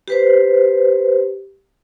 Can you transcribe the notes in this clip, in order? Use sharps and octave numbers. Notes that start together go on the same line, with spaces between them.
G4 B4 C5